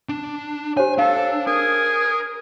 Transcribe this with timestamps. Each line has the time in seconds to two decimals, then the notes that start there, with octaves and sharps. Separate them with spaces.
0.09 D4
0.77 G4 C5 C#5 G#5
0.98 D4 A4 F5 A5
1.47 G#4 A#4